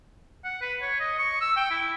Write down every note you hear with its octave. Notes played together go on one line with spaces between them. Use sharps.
F#5
B4
C#5
D#5
C#6
E6
G5
E4